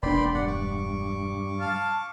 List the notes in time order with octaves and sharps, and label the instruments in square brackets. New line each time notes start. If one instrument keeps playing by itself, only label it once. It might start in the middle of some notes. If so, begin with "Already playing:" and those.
[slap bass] E1 D4 [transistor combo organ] A#3 B3 G5 [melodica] D5 B5 C6
[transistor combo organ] G2 [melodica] D5 F#5
[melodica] C#6 D6
[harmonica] F5 A5